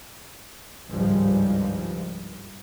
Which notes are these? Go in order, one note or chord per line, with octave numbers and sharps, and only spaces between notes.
G#1 C#2 G2 F3 G3 G#3